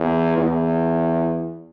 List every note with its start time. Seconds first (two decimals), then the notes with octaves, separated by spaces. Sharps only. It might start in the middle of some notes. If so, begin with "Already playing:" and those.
Already playing: E2
0.38 E2